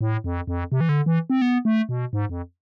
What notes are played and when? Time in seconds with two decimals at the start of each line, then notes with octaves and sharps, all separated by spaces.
0.01 A2
0.24 F2
0.47 F2
0.72 C3
0.81 E3
0.89 D3
1.06 E3
1.30 C4
1.42 B3
1.65 A3
1.89 B2
2.13 G#2
2.29 F2